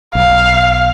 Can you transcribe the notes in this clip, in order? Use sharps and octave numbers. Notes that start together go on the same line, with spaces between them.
B1 F5